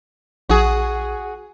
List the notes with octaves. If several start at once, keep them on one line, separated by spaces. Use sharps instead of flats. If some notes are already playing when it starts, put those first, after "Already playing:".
A#1 F#4 G#4